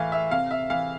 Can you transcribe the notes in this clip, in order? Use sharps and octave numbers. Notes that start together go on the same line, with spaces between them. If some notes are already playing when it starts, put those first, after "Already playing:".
Already playing: A2 E3 E5 F5
E5
C3 F5
E5
E3 F5